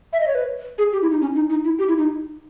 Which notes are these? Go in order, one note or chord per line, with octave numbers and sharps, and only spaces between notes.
E5
D#5
C#5
B4
G#4
G4
E4
D#4
C#4
D#4
D#4
E4
G4
E4
D#4